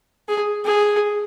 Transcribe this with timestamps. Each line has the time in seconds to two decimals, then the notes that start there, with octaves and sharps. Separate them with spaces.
0.28 G#4
0.65 G#4